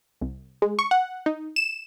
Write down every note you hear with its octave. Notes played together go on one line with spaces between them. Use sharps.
C2
G#3
C#6
F#5
D#4
E7